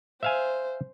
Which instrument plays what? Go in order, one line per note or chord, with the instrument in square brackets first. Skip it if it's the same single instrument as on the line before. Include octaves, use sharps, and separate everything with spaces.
[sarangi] C5 [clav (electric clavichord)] E5 F5 G#5